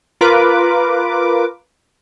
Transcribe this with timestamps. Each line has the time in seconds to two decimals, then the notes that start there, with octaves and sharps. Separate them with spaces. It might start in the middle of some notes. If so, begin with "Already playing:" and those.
0.21 F4 A#4 B4 D6